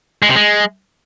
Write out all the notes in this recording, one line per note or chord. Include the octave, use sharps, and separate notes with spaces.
G#3
C3
G#3